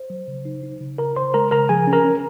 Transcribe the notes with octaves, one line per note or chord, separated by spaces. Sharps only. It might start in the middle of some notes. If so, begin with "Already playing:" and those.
Already playing: C5
F#3
C#3
D#4
D#4
C#3
C#3 A#4 A#5
C#3 C5 C6
G#3 A#4 A#5
C#3 A#4 A#5
F3 G#4 G#5
C#4
A#4 A#5
C#4